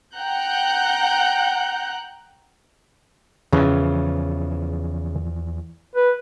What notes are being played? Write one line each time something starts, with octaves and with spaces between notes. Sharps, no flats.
F#5 G5 A#5 F#6 G6
E2 C#3 E3 F3
B4